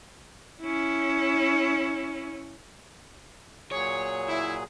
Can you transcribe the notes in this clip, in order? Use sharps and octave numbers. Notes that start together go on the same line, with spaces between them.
C#4 E4
A#2 F#3 G#4 C#5
E4